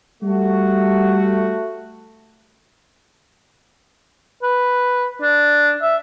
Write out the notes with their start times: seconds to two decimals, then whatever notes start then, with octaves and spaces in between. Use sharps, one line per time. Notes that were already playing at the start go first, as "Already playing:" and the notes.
0.23 G3 A3 F#4
4.43 B4
5.22 D4
5.82 E5